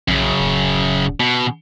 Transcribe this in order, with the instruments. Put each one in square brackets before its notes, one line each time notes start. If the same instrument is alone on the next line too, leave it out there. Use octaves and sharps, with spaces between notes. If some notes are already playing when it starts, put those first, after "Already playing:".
[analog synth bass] A#1 [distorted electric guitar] F#2 C#3
[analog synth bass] D1
[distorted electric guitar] B2